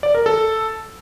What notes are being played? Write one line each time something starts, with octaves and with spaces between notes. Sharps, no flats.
D5
A#4
A4